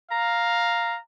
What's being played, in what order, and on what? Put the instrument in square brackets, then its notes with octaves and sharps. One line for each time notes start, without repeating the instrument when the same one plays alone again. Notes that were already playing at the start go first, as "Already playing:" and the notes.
[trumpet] F5 [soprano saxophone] A#5